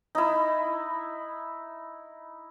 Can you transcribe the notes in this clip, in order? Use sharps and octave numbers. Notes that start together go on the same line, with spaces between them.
D#4 E4